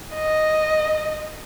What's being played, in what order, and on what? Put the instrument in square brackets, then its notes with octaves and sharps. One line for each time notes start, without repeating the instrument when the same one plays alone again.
[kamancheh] D#5